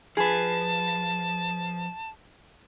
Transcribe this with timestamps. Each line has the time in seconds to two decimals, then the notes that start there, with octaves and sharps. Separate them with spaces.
0.17 F3 G#4 B4 A5